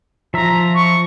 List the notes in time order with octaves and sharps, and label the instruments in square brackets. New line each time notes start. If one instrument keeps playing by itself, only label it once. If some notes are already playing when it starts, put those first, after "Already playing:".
[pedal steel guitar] F3 E5 [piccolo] A#5
[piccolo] C#6